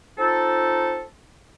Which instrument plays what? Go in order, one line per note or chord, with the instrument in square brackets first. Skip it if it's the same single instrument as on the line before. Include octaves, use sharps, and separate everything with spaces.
[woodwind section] C4 D#4 F4 A4